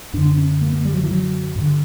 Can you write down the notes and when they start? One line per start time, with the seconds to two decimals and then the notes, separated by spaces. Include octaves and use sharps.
0.13 F#2 D4
0.18 D3
0.25 D4
0.38 C#4
0.61 A#3
0.73 A#3
0.85 G3
0.94 F#3
1.04 E3
1.11 F#3
1.56 G2 D3